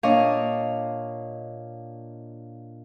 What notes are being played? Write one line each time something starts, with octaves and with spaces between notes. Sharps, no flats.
A#2 D4 C#5 D#5 F5